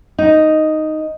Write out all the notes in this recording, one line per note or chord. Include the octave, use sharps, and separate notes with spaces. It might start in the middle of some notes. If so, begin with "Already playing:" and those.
D#4